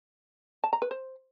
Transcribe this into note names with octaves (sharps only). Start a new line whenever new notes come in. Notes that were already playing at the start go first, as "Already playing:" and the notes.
A5
A#5
B4
C5